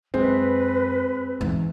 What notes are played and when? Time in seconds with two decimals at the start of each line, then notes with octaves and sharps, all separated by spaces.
0.14 F#2 G#3 C4 B4
1.41 E2 G#2